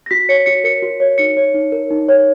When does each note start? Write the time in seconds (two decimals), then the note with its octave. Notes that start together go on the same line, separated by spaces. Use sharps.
0.06 A#6
0.11 F#4 B6
0.29 C#5 C#7
0.46 F#4 C#7
0.64 A#4 C#7
0.82 F#4
1.00 C#5
1.18 D#4 C#7
1.37 C#5
1.54 D#4
1.72 A#4
1.91 D#4
2.08 C#5